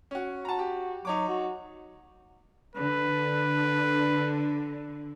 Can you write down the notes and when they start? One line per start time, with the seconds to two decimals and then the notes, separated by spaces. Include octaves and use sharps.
0.11 C#4 F#4
0.45 F#4 A5 A#5
0.59 G4
1.05 F#3 D#4 C#5 D6
1.28 F#4
2.76 D3 B4